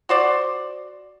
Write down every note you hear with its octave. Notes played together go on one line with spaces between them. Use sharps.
F#4 C5 D5